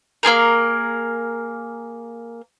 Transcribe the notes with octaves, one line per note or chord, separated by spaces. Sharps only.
A#3 C4 G#4 A#4